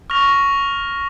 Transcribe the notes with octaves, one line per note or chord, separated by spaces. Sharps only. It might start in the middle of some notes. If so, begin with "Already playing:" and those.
C#6 F6 A#6 F7